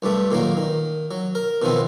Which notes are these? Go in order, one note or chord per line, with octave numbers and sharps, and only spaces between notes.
C2 G2 G3 A3
A#2 D#3 F#3 A#3
D#3
F#3
A#4
B2 D#3 F3 B3 C4